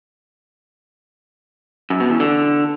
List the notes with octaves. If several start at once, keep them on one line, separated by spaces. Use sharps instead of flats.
F#2
B2
E2
D3